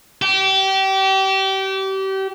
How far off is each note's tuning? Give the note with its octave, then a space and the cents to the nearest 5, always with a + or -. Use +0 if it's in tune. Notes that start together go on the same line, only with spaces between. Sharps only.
G4 -30